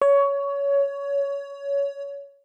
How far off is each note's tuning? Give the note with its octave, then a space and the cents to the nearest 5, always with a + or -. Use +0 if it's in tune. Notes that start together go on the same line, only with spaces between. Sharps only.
C#5 +20